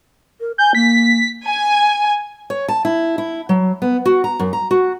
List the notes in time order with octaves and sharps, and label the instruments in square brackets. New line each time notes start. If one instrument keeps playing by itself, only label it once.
[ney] A#4
[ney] G#5 [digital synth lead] G6
[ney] A#3 [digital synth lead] B6
[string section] G#5
[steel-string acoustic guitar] C#5
A5
E4
E4
F#3
B3
F#4
A#5
F#2
A#5
F#4